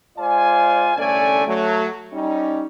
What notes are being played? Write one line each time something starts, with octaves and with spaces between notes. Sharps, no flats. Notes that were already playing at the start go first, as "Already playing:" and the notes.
G#3 F4 C5 D5 G#5
C2 D3 A3 C#4 D5 G#5
F#3 A3
G3 C#4 D#4